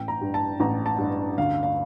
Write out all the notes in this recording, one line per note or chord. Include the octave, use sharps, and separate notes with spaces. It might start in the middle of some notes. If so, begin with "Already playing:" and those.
Already playing: A1 G5
A#5
G2
A5
A1 A#5
A5
G2
D2 F5
F5